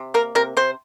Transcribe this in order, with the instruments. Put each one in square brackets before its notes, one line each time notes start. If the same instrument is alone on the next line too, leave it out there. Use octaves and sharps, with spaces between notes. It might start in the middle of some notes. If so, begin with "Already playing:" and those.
Already playing: [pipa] C3
A#3 A#4
C3 A#4
C3 C5